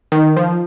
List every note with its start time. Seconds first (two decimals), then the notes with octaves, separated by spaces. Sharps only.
0.12 D#3
0.36 F3